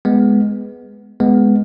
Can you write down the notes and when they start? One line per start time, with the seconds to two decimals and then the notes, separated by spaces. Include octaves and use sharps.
0.05 G#3 B3
1.20 G#3 B3